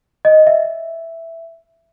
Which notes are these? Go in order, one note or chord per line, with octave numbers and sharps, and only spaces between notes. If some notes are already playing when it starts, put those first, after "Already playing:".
D#5
E5